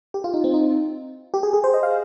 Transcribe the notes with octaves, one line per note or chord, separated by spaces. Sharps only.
G4
F4
D#4
C4
D#4
G4
G#4
G#4
C5
D#5
F5